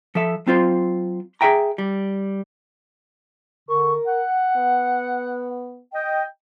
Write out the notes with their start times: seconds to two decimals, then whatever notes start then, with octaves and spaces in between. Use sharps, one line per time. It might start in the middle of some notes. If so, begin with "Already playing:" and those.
0.15 F3 A4 E5
0.47 F#3 C4 F4 C5
1.41 G#4 B4 E5 G5 A#5
1.78 G3
3.69 D3 A#4 C#6
4.06 F#5
4.56 B3
5.93 D#5 G5